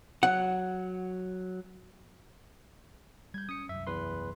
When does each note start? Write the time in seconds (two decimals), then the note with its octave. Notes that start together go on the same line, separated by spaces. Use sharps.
0.23 F#3 F#5
3.34 G3 G6 G#6
3.49 C#4 D#6 C#7
3.69 C2 F#2 E5
3.87 E2 B4 C6